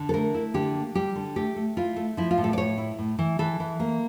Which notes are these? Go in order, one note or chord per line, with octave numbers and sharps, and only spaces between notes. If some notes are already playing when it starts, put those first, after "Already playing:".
Already playing: D3
A4
A3 A#4
E4
D3 G4
A#3
G3 G4
D3
A3 G4
A3
E4 F4
A3
F3 E4
F4
A2
A4
D5
A2 C#5
E4
A2
E3
E3 A4
E3
A#3